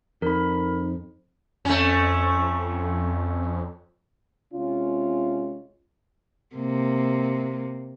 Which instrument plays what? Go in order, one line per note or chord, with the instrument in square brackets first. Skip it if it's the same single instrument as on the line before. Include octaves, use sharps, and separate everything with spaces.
[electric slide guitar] F2 [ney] D#4 [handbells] A#4 B5
[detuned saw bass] F2 [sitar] A3 C#4
[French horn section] C3 G#3 C#4 F4
[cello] C3 A#3